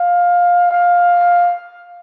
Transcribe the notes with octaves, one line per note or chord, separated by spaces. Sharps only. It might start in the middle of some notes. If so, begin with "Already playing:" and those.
Already playing: F5
F5